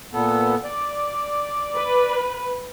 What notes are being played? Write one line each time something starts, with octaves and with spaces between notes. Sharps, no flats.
A#2 B3 A4
D5
B4